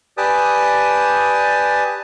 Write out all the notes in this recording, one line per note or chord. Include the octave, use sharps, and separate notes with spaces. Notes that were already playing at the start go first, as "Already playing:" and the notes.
G4 B4 D5 G#5 A5 D#6